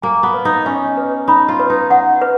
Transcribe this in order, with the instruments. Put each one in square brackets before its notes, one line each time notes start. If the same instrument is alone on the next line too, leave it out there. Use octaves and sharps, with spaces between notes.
[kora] A#3 [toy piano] G#5
[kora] B3
[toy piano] B4
[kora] D#4
[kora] C#4 [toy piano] D#5
[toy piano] B4
[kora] D#4 [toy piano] B5
[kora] F4
[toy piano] B4
[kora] D#4
[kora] D#4 [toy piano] F#5
[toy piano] B4